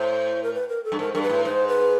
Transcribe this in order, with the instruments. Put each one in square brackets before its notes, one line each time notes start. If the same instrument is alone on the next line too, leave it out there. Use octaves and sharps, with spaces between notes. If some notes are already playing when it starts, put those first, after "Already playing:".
Already playing: [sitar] A2 [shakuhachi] C5
[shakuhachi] A#4
B4
A#4
A4
[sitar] G2
[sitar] G#2 [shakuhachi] A#4
[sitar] G2 [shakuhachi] A#4
[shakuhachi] B4
[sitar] A2
[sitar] G#2 [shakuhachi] C5
[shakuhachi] B4